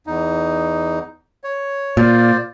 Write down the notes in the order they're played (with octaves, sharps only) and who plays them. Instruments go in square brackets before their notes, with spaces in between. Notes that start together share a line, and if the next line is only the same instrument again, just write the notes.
[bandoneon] E2 D#4
C#5
[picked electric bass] A#2 [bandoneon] F4 C5 D5